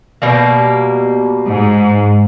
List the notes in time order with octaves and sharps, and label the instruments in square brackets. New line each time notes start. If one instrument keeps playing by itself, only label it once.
[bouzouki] B2 G3 A#3
[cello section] G#2